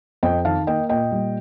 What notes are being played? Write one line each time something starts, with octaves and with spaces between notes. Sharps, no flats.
F2 D#5 G5
D#3 F5 A5
A#3 D#5 G5
A#2 D#5 G5
G3